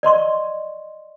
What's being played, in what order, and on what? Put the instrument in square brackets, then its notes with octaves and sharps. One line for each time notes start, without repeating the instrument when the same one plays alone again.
[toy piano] D5 D#5 C6 C#6